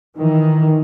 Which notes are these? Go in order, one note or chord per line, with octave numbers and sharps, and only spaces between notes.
D#3 E3